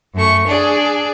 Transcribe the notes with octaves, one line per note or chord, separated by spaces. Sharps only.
F#2 A3 C#6
D4 G#4 D5